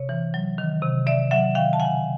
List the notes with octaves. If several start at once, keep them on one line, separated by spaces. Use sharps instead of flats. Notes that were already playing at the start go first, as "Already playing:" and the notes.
Already playing: C3 C#5
E3
F#3
D#3
C3
C3 D5 E5
F#3 E5 F#5
D#3 F5 G5
A5
C#3 F#5 G#5